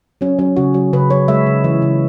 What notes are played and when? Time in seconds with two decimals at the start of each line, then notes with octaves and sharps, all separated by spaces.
0.21 F#3 C#4
0.39 F#3 C#4
0.56 C#3 F#4
0.74 F#3
0.93 C#3 B4
1.10 F#3 C#5
1.28 G#3 E5
1.47 C#3
1.64 E3
1.82 C#3